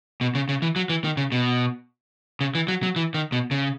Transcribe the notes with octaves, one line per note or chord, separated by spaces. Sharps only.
B2
C#3
C#3
E3
F#3
E3
D#3
C#3
B2
C#3
E3
F#3
F#3
E3
D#3
B2
C#3